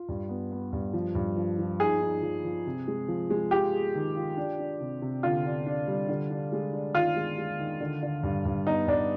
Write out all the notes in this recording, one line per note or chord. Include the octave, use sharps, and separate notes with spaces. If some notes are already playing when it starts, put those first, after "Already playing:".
Already playing: F4
G2
B3
B3
G2
F3
G2
F3
F3
D#4 G#4
D#4
F3
F3
C3
G#3
F3
G#3
F4 G4
G#4
D#3
F4
D4
D4
C3
C3
D3 F4
D4
D4
G3
D3
D4
G#3
D4
D#3 F4
G#3
G#3
D#3
D3
D3
G2
G2
B3 D#4
G2 D4